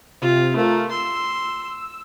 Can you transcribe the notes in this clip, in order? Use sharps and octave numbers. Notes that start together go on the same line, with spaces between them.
C3 F4
A3 F4 A#4
C6 E6